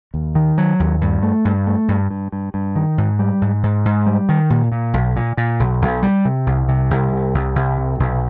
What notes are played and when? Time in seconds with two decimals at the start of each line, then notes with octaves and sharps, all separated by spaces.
0.14 D#2
0.35 D#3
0.58 F#3
0.80 D#2
1.01 G2
1.23 A3
1.45 G2
1.67 A3
1.88 G2
2.10 G2
2.32 G2
2.54 G2
2.76 D#3
2.98 G#2
3.19 G3
3.41 G#2
3.63 G#2
3.85 G#2
4.06 G3
4.29 D#3
4.50 A#2
4.72 A#2
4.94 B1
5.16 A#2
5.37 A#2
5.60 B1
5.82 B1
6.03 G3
6.25 C3
6.47 C2
6.68 C3
6.90 C2
7.13 C3
7.34 C2
7.55 C2
7.78 C3
7.99 B1